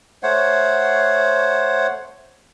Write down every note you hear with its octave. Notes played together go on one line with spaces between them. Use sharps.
A3 C5 C#5 F#5